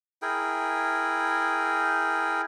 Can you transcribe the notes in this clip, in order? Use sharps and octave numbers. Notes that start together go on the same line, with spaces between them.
E4 G#4 A#4 G5